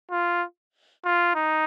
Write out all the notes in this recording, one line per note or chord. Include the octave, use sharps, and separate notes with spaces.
F4
F4
D#4